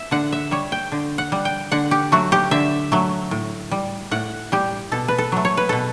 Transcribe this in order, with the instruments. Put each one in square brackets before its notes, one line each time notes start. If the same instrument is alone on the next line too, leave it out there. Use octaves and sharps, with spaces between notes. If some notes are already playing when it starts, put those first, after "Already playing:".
Already playing: [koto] E5
D3 F#5
E5
G3 C#5
G5
D3
F#5
G3
G5
D3 F#5
G4
F#3 A3 F#4
G4
D3 E5
F#3 A3
A2
G3
A2 F#5
G3 G4
B2 A4
B4
A4
F#3 A3
C#5
B4
B2 A4